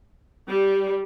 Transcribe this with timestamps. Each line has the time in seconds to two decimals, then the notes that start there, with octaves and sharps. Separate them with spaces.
0.50 G3